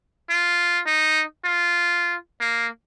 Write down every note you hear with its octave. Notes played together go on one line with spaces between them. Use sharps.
F4
D#4
F4
A#3